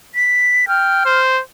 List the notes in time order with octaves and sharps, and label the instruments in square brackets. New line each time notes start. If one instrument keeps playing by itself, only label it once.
[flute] B6
[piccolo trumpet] G5 [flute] F6
[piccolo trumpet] C5